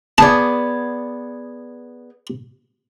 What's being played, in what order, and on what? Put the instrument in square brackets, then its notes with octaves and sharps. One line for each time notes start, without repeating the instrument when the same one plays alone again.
[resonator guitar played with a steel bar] B3 G#4 D5 [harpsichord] A5